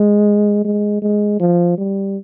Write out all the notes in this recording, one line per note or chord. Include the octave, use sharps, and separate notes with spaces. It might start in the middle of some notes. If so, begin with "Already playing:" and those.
Already playing: G#3
G#3
G#3
F3
G3